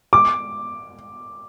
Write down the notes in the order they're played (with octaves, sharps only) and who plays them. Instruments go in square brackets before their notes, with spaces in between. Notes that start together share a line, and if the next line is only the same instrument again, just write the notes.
[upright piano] D6